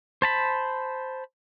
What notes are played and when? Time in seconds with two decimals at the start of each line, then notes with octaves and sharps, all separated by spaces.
0.22 C5 A5 B5